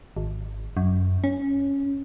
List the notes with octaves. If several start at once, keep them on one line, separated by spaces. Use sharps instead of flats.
G#1
F#2
C#4